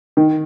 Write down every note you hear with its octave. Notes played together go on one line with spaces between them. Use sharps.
D#3